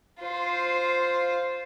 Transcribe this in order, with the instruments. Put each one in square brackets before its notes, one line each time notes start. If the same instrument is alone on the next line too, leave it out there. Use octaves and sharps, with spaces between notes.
[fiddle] F4 C5